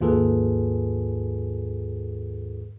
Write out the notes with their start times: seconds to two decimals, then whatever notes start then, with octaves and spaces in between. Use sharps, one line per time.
0.01 D#2 G#2 F4 G#4 A4 B4